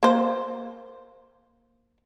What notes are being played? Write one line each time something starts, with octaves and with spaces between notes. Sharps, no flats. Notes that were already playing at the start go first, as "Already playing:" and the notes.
A#3 C5